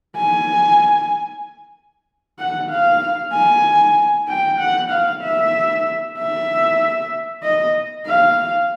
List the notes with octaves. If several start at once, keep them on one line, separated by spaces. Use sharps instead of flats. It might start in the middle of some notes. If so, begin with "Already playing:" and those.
G#5
F#5
F5
G#5
G5
F#5
F5
E5
E5
D#5
F5